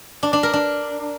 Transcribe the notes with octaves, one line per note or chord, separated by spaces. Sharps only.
D4
D4
A#4
D4